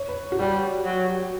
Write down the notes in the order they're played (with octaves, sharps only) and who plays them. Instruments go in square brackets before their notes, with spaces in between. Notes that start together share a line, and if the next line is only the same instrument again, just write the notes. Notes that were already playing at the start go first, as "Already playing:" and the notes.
Already playing: [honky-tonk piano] C#5
B4
F#4
[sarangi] G3 [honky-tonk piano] G4
[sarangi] F#3